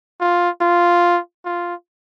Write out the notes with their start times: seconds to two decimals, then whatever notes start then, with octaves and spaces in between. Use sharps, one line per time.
0.20 F4
0.61 F4
1.45 F4